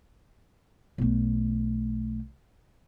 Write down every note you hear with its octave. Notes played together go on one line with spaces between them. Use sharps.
B1 A3